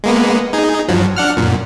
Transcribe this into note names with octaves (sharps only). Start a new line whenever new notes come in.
G#3 A#3 B3
D#4 G#4
G2 F3 F#3
D4 F#5 F6
F#2 A#2